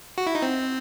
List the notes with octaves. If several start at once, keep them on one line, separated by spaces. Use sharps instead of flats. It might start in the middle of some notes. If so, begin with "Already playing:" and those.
F#4
E4
D#4
C4